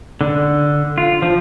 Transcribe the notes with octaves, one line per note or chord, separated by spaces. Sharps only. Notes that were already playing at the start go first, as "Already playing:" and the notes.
D3
F4
F3